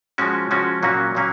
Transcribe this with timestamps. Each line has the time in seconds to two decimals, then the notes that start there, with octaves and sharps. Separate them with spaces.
0.18 F3 G#3 C#4 F#4
0.51 F3 G#3 C#4 F#4
0.83 A#2 F#3 A#3 C#4 F#4
1.15 A#2 F#3 A#3 C#4